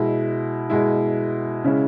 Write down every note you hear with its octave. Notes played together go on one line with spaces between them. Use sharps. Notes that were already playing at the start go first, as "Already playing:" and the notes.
Already playing: B2 G#3 E4
B2 G#3 E4
C#3 G#3 C#4 E4